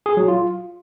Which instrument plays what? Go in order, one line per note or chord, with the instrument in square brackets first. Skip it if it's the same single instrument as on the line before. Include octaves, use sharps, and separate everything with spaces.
[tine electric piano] G#4
F#3
F4